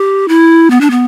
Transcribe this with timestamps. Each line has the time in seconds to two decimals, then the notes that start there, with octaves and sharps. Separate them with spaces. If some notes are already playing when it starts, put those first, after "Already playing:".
Already playing: G4
0.28 E4
0.70 B3
0.81 D4
0.91 B3